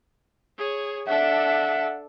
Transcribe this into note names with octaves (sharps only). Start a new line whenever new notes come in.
G#4 C#5
D4 A4 E5 F#5